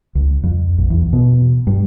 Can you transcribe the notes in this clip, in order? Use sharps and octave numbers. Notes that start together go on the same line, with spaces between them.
C#2
F2
A#1
E2
B2
G2